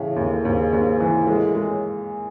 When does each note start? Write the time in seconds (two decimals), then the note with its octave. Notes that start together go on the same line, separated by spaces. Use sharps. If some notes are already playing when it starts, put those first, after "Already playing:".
Already playing: A2 C#3 E3
0.16 D#2
0.33 A2
0.45 D#2 G#2
0.73 D#2
1.00 E3
1.27 A2 G#3
1.55 G#3